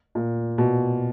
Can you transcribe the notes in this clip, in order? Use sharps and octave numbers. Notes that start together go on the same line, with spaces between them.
A#2
B2